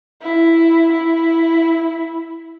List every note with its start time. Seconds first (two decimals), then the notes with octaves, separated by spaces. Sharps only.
0.22 E4
0.93 E4